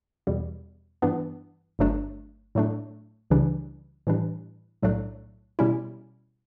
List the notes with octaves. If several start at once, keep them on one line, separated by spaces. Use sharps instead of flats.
E2 B2 G3
G2 E3 B3 D4
G1 G2 F#3 A3 D4
A2 F#3 A3 D4
C#2 C#3 E3 G3 D4
A2 E3 G3 D4
B1 A2 F#3 A3 D4
B2 G3 C#4 E4